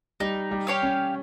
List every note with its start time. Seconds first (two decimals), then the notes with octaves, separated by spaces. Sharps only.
0.20 G3 D#4
0.51 G3
0.67 G4 C#5 F5
0.83 C#4